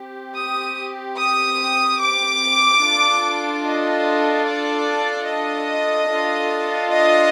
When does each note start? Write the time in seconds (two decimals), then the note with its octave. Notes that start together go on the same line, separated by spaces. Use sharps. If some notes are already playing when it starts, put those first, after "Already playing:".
Already playing: C4 G4
0.36 D#6
1.17 D#6
1.99 D6
2.81 D4 F4 A4
3.63 D#5
4.45 D5
5.26 D#5
6.08 D4 F4 A4
6.90 D#5